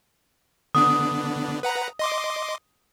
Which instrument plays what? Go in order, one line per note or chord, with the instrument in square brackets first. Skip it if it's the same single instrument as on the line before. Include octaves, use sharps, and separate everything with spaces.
[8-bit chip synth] D3 B3 D4 [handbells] D#6
[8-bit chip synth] B4 F#5 A#5
D#5 C6 D6